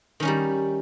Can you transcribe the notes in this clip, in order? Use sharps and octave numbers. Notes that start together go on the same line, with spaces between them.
D#3 G3 C#4 D#4